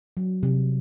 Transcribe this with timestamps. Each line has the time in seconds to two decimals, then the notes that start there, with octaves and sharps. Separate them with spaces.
0.17 F#3
0.43 C3